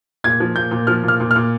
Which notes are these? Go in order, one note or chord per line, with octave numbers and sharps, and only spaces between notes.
A#2 G#6
F3
A#2 G6
A#2
F3 F6
A#2
F6
A#2
F6
A#2